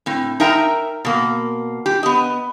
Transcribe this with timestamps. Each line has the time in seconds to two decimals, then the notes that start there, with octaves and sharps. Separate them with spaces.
0.06 A2 C4
0.40 D#4 A#4 E5 G5 A#5
1.05 B2 A#3
1.86 G4
2.03 B3 D#5